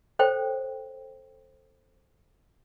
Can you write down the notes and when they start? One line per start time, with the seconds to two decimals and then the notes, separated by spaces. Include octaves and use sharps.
0.19 A4 C5 C#5 G5